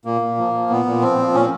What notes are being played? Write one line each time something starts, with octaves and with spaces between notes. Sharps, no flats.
A#2 A#3
A#2
F3
F3
A#2 B3
A#2
F3 C4
F3
A#2 C#4
C4